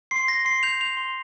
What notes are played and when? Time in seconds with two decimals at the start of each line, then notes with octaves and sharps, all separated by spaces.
0.11 C6 C7
0.28 C6 A#6
0.45 C6 C7
0.63 G6 F7
0.80 G6 F7
0.97 C6